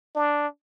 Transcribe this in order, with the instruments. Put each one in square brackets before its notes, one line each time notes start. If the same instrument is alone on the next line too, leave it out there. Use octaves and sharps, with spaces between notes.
[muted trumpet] D4